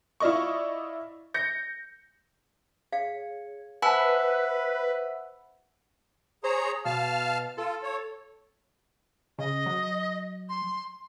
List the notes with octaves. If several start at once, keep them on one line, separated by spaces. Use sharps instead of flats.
E4 F4 D5 D#5 C#6
G6 A#6 C#7
G#4 C#5 F5
B4 C5 E5 F#5 G#5 A5 B5 E6
G#4 C5 C#5 A#5
B2 F5 A5 F6
F4 A4
C#5
C#3 D#5
F#3
C6